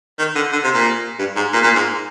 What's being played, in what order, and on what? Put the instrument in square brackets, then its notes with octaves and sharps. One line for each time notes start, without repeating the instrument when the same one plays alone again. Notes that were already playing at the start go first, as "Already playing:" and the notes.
[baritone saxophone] D#3
D3
D3
C3
A#2
G2
G#2
A#2
A#2
G#2